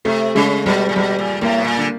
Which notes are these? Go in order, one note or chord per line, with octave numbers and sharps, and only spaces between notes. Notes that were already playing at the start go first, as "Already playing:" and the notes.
C3 A3
C#3 G#3
B2 G3
A#2
B2 G3
A#2
A2 A#3
B2
A#2
D3